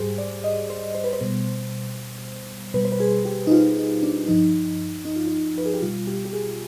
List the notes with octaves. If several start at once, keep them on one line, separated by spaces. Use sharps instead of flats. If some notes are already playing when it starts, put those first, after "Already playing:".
Already playing: G#2 G3 G4 G#4 C5
D5
D#5
C5
C5
B4
C5
B2 G3
B2 G3 B4
C5
B4
G#4
G4
D#4
F4
D#4
D4
G2 F3 D#4
D#4
F4
D#4
B4
G#4
G4
B2 G3 F4
G4
G4
G#4